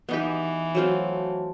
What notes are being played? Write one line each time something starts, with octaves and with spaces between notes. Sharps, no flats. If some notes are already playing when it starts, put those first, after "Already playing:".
E3 B3 D#4 G4
F#3 A3 C4 F4